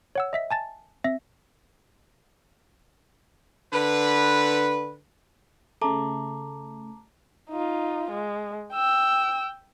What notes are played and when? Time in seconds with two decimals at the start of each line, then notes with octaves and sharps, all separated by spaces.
0.15 C#5 F#5 E6
0.33 D#5 E5 B6
0.51 G#5 A5 A6
1.04 C4 E5 A#6
3.73 D3 B4
5.82 C#3 A3 A5 A#5 D6
7.50 D#4 F4
8.11 G#3
8.73 G5 E6